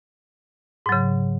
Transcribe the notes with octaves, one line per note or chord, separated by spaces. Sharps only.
G#2 C#3 F#3